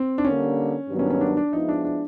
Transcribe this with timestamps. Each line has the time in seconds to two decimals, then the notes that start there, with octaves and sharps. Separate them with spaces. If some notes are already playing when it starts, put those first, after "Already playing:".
Already playing: C4
0.18 D4
0.24 D3 G3 A#3 C#4
0.88 G2 D#3 F#3 B3
0.99 C#4
1.10 C#4
1.21 D4
1.37 D4
1.53 F3 G#3 B3 D#4 E4
1.69 D4
1.85 D4